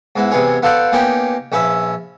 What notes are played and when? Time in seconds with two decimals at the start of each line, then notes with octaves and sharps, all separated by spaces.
0.16 G#2 B3 E4
0.31 E2 C3 B3 G#4 C#5
0.62 B3 F4 A4 C5 D5 F#5
0.92 A#3 B3 C#4 D#4 G4
1.52 A#1 C#4 B4 E5